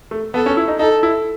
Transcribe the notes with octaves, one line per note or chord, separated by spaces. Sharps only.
A3
B3 A4
C#4
E4
D#4
D#4 A4
E4